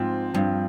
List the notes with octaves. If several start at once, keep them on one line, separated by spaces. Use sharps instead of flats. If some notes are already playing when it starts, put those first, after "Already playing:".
Already playing: G#2 F3 C4 F4
G2 F3 C4 F4